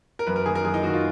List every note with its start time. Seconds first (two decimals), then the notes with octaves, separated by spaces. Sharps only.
0.19 A#4
0.27 F#2 B4
0.36 A#4
0.46 D#3 A#3 G#4
0.55 A#4
0.64 F#2 G#4
0.74 D#4
0.83 D#3 A#3 F#4
0.93 F4